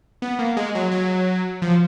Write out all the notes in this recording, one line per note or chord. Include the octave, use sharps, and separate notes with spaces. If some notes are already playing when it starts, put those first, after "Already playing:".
B3
A#3
G#3
F#3
F#3
F3